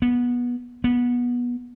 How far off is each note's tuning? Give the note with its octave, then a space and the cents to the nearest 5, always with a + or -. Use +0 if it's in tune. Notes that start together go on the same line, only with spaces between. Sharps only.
B3 -20
B3 -20